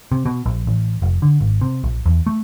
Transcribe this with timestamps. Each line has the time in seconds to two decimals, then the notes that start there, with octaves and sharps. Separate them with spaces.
0.12 C3
0.25 B2
0.46 A#1
0.67 A1
1.02 F1
1.22 D3
1.41 G#1
1.61 C3
1.84 A#1
2.06 E2
2.26 A3